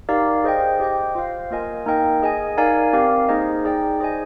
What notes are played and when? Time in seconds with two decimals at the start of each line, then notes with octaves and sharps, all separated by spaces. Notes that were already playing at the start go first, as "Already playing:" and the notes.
0.09 D#4 G4 A#4 D5 F5
0.44 G#4 C5 D#5 G5
0.80 G4 C5 D#5 G5
1.15 F4 C5 F5
1.50 A#3 F4 A#4 D#5 G#5
1.86 A#3 D#4 A#4 D#5 G5
2.23 G#4 D#5 G#5
2.58 D#4 A#4 D5 F5 G#5
2.93 C4 G4 A#4 F5
3.29 A#3 D#4 G#4 C5 D#5
3.65 D#4 G#4 D5 G5
4.00 D#4 G#4 C5 D#5 G#5